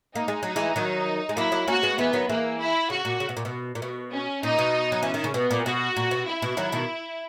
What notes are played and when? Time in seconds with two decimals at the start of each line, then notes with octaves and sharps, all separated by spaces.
0.15 A#3 D#4
0.28 G#3
0.43 F#3 D#4
0.56 E3 G#3
0.76 D#3 F#3
1.29 G#3
1.37 F#3 A#3 E4
1.52 F#3 A#3
1.68 A#3 C#4 F#4
1.83 G#3 B3
1.98 E3 G#3 B3
2.13 D#3 F#3
2.29 E3 G#3 A#3
2.59 E4
2.90 C#3 F#4
3.05 A#2
3.20 C#3
3.29 B2
3.37 A#2
3.45 B2
3.75 A#2
3.82 B2
4.12 C#4
4.43 A#2 D#4
4.59 B2
4.92 F#3
5.03 E3 C#4
5.14 D#3
5.24 C#3
5.34 B2 B3
5.51 A#2
5.65 B2 F#4
5.97 A#2
6.11 B2
6.26 E4
6.42 B2
6.57 D#3 F#3
6.72 B2 D#3